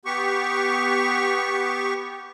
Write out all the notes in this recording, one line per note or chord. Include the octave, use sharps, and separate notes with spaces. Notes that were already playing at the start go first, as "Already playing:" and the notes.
B3 G4 C#6